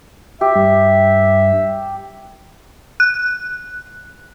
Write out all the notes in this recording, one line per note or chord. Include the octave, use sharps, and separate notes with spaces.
G4 E5
G2
F#6